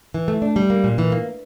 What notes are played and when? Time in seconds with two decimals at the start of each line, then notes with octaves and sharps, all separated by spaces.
0.14 E3
0.28 A3
0.42 D4
0.56 G3
0.70 A#3
0.84 A#2
0.98 E3
1.12 A#3